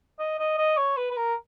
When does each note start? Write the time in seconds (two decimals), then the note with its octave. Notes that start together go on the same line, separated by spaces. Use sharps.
0.19 D#5
0.39 D#5
0.58 D#5
0.77 C#5
0.97 B4
1.11 B4
1.17 A#4